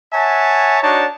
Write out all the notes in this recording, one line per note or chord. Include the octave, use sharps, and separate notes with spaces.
C#5 E5 F#5 G#5 A5
D4 D#4 F#4 C#5 A5